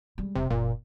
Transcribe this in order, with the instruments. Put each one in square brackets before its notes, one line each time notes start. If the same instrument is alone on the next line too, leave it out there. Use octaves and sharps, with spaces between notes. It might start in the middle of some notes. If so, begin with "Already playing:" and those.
[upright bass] G3 G#3
[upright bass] E1 [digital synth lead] C3
[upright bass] F#1 [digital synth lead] A#2